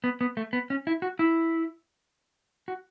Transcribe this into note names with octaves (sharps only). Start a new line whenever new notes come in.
B3
B3
A3
B3
C#4
E4
F#4
E4
F#4